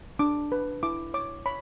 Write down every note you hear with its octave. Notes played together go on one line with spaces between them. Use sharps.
D4 D6
B4
E4 D6
C#5 D6
C#5 B5